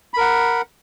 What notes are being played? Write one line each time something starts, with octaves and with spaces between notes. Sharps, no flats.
A#4 F#5 B5